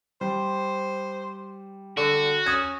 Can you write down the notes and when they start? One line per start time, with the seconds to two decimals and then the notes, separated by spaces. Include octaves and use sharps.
0.21 G3 C5
1.97 D3 F#4
2.46 C#4 D#6 G#6